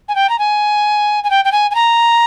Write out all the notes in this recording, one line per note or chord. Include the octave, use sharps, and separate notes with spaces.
G#5
G5
A#5
G#5
G#5
G5
G5
G#5
G#5
A#5